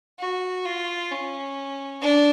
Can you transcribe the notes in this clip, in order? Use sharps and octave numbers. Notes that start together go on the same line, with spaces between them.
F#4
F4
C#4
D4